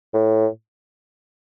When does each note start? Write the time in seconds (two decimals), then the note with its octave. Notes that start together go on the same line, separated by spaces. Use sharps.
0.14 A2